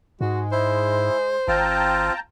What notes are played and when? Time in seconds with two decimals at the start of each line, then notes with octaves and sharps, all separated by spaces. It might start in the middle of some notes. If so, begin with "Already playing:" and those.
0.21 G#2 G#3 F#4
0.52 E4 C5
1.48 G#1 C4 F4 G5 A5 A#5